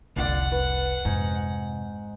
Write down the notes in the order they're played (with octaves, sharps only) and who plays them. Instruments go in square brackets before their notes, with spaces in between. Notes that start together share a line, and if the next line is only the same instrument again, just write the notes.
[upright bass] F1 C2 [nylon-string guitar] D3 F4 D5 [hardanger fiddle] F#5
[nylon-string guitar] B4
[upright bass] F2 C3 [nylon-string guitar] G#2